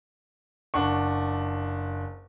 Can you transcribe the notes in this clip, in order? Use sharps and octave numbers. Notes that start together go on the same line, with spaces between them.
F#1 D4 F#5 C#6